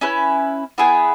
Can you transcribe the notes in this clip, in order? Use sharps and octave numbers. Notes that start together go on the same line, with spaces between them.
C#4 E4 B4
B3 E4 G#4 B4